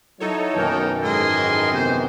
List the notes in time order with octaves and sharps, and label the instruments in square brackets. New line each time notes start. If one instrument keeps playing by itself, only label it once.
[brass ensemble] F#3 E4 [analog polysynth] D#4 A4 C#5
[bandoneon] F#2 D#3 E3 [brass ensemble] B2 A#3 [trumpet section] A#4 G5
[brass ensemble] G#2 [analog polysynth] A4 D#5 [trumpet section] A#4 G#5 C6
[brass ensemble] C3 B3 [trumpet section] G#3 D#4 C5